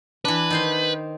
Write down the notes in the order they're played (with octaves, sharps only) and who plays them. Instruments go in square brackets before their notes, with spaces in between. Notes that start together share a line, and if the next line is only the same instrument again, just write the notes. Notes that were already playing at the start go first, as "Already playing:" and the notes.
[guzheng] E3 D4 [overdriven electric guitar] B4
[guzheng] D#3 C5 C6